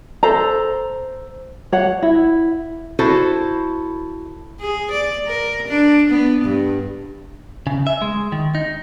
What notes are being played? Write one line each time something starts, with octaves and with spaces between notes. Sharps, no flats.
A4 C5 A#5
C#5 F#5
E4
E4 F#4 A4 C5
G#4
D5
A#4
D4
B3
G2
C#3
E5
G#3
D#3
D#4